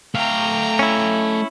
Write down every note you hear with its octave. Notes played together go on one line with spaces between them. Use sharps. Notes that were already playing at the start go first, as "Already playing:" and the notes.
A3 F5 G5 A#5
C#4 E4